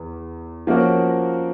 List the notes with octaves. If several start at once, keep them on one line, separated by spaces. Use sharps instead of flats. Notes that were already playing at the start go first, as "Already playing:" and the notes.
Already playing: E2
F3 A#3 C#4 F#4 A#4